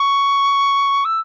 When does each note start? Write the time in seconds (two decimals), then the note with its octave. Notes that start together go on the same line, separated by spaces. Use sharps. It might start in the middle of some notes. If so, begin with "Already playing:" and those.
Already playing: C#6
1.05 E6